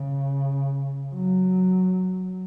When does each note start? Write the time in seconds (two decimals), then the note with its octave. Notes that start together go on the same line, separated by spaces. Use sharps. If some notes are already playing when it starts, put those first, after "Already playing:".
Already playing: C#3
1.14 F#3